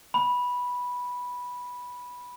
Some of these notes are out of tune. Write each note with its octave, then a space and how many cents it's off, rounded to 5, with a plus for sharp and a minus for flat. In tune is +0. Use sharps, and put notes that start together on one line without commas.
B5 -10